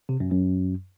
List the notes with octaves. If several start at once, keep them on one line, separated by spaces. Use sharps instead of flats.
C3
F#2
F#2